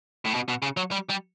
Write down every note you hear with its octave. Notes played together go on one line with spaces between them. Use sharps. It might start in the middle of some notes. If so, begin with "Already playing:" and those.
A2
B2
B2
C#3
F#3
G3
G3